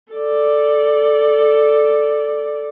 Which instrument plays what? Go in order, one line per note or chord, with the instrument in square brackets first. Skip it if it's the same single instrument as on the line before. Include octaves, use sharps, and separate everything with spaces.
[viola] A4 D5